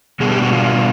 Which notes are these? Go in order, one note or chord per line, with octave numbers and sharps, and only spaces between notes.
B2 G3 B3 D4 G#4
G4
F#4
F4